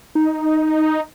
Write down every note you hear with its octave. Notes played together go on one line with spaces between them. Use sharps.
D#4